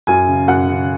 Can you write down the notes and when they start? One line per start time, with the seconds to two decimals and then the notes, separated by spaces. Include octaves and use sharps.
0.07 F#2 G#5
0.28 C#3
0.47 F#2 F#5
0.68 C#3